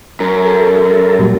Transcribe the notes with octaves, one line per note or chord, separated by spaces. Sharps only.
F#2 A#4
A4 A#4
A#2 F#3 G3